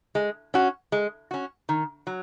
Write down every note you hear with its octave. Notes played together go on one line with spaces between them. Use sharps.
G#3
C#4 F#4
G#3
C#4 F#4
D#3
F#3